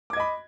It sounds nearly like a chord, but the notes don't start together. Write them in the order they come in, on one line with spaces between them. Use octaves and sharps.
D6 G#6 D#5 B5